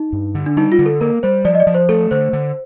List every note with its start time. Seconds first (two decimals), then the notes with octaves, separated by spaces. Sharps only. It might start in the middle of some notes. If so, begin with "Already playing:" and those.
Already playing: D#4
0.13 G2
0.35 D3
0.46 D4
0.57 G3 D#4
0.72 F4
0.79 D3
0.86 A4
1.01 A#3 A#4
1.23 G3 C5
1.45 F3 D5
1.55 D#5
1.60 D5
1.67 F3
1.74 C5
1.89 A3 A4
2.11 D3 C5
2.33 D3